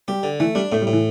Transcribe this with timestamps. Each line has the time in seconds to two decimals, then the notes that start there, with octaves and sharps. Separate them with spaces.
0.08 G3 G4
0.23 D3
0.40 E3 A3
0.55 G3 D4
0.72 A2 A3
0.82 G3
0.87 A2
0.93 E3